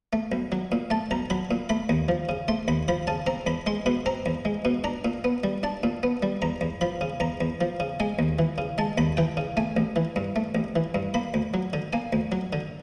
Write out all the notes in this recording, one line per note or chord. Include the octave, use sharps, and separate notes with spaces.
A3
B1
F#3
A#2
A3 A5
B1 A#5
F#3 B5
A#2
A3 B5
D#2
F3
C#3
A3 C6
D#2 B5
F3 B5
C#3 A5
C4 A#5
E2 B5
G#3 C6
B2 B5
C4 A#5
E2
G#3
B2
D4 A#5
A#2
B3
G3
D4 A5
A#2
B3
G3
E2 A#5
E2
F3 B5
C#3
E2 A#5
E2
F3
C#3
G#3 G#5
D#2
E3
C#3
G#3 A5
D#2 B5
E3 G5
C#3
A3 G#5
A1
E3
G2
A3
A1
E3
G2
A#3 B5
D2
F#3
D3
A#3 G#5
D2
F#3
D3